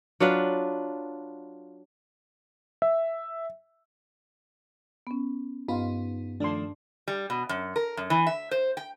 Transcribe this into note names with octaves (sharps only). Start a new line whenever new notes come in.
F#3 D4 F4 B4
E5
B3 C#4
G2 B3 D#4 F4
D#3 F3 A3 D4 C6
G3
B2
F#2
A#4
F#2
E3
E5
C5
G5